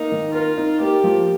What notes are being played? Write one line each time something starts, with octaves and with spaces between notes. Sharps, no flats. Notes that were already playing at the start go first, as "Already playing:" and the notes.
Already playing: A#3 D#4
D#3
F4 A#4
D#4
A#3 G4
F3